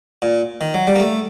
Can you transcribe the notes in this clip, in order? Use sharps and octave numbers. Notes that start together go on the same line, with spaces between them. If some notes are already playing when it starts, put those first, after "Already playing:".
A#2
D#3
F#3
G3
A#3
A3